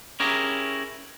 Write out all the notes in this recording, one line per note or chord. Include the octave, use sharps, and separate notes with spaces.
C#4 E4 G4 G#4 A#4